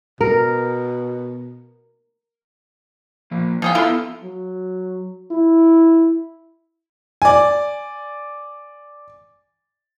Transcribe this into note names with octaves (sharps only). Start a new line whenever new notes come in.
B2 A#4
F3 A#3
B2 F3 G#4 F5 G5
B3 E4 F4 A4 C6
F#3
E4
D5 G#5